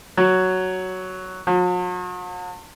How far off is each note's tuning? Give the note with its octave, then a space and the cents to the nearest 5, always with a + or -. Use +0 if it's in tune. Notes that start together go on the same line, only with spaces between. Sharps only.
F#3 +5
F#3 -45